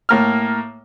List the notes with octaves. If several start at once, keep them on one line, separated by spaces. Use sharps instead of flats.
A2 A#3 F6